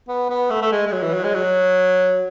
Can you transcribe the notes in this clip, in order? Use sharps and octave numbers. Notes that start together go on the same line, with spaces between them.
B3
B3
A3
A3
G#3
G#3
F#3
E3
F#3
G#3
F#3